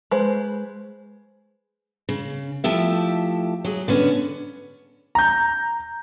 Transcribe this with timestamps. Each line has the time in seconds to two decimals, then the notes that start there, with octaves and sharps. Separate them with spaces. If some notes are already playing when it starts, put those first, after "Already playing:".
0.11 G#3 B4 C5
2.09 C#3
2.64 F3 A3 E4 G4 E5
3.65 F#3 G#4
3.88 D3 B3 C#4
5.15 A#5 G6